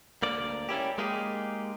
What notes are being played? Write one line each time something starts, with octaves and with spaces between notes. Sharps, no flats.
D2 A#3 D5
G3 C#4 E4 G4
G#3 A#3 D#4 G4 G#4